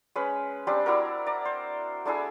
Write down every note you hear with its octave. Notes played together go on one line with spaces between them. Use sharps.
G#3 C#4 B4
G3 C4 D4 G4
D4 E4 F#4 A#4
D5 A#5
C5
A3 D4 E4 G#4